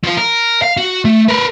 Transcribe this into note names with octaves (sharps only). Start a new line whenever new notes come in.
F3 F4
A#4
F5
F#4
A3
A#4 B4